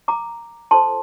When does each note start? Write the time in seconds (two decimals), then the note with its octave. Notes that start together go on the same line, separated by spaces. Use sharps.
0.08 A#5 D6
0.71 F4 A4 C5 A5 C6